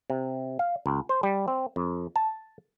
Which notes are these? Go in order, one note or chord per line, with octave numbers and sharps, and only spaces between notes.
C3
F5
C#2
C5
G3
C4
F2
A5